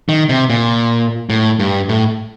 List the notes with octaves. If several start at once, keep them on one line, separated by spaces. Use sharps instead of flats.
D#3
C3
A#2
A2
G2
A2